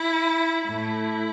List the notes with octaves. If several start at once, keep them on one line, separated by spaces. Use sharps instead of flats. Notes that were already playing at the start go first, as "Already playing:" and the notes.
Already playing: E4
A2 A3 E4